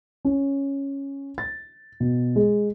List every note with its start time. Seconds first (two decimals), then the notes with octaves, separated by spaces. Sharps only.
0.25 C#4
1.38 A6
2.00 B2
2.36 G#3